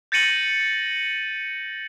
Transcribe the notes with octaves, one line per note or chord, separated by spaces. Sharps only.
G6 A6 A#6 C#7 D#7 F#7